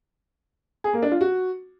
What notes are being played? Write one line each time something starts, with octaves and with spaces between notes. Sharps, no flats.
G#4
A#3
D4
F4
F#4